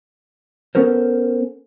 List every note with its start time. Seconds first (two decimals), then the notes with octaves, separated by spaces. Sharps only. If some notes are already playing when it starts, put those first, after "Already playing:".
0.75 B3 C#4 A4 A#4 C5